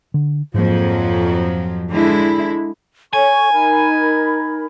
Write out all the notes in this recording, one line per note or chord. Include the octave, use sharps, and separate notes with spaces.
D3
F2 G#2 F3 F#3 A#3
D3 G#3 E4
A4 C#5 G#5 C#6
D#4 A#4 B5